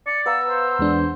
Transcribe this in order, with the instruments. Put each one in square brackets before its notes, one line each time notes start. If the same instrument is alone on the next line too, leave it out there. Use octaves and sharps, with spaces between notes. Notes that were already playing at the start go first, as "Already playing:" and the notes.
[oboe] D5 [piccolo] C#7
[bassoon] B3 [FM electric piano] B4 F5 A#5 [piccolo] E6
[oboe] C5
[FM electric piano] E2 G#3 D4